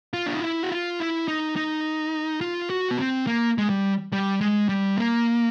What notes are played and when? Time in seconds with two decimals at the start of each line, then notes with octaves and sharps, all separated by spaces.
0.14 F4
0.26 D4
0.34 D#4
0.43 E4
0.63 F#4
0.72 F4
1.00 E4
1.28 D#4
1.56 D#4
2.41 F4
2.70 F#4
2.91 B3
2.99 C4
3.27 A#3
3.58 G#3
3.70 G3
4.13 G3
4.41 G#3
4.69 G3
4.97 A#3